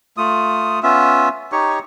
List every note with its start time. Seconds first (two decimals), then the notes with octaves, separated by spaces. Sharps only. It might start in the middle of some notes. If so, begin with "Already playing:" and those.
0.17 A3 F4 D#6
0.83 B3 C#4 F4 E5
1.52 D#4 G4 C#5 C#6